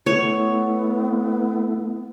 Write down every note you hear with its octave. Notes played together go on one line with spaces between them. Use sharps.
A3 B3 E4 C#5